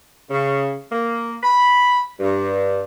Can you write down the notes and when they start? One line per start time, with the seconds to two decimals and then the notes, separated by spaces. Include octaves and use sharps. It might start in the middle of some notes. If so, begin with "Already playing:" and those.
0.31 C#3
0.91 A#3
1.43 B5
2.20 G2